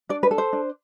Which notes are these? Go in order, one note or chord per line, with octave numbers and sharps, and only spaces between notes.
D4 D5
B4
A4
C5
D4